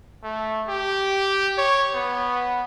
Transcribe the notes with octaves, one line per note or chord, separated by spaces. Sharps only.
A3
G4
C#5
B3